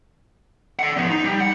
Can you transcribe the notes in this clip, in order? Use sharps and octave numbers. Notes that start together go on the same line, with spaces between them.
D5 F#5
F3 B3
D#4
G3
F#5